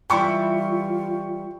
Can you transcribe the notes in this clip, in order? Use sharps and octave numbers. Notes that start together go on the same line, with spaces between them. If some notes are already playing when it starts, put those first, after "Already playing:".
E3 G3 E4 F4 G5 C#6